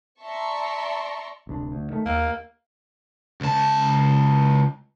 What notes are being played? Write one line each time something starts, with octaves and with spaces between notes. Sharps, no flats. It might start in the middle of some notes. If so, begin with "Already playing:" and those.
D5 E5 A5 A#5 C6 C#6
D1 C2 D4
D2
D#3 A3
D#2 A#3
C#2 A5